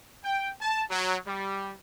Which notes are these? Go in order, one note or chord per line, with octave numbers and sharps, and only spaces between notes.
G5
A5
F#3
G3